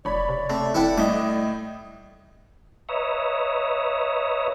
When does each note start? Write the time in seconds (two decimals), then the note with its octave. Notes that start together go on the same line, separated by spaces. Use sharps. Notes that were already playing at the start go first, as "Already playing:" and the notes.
0.05 F1 C#5 D5 B5
0.28 C3
0.50 A3 C4
0.74 D#1 E4 A4 B4 F#5 G5
0.98 A2 G3 E4 D#5 D6
2.89 B4 C#5 D#5 E5 A#5